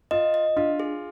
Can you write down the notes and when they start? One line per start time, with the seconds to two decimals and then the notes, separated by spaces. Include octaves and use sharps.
0.11 F4 D#5
0.34 D#5
0.57 D4 F4
0.80 G#4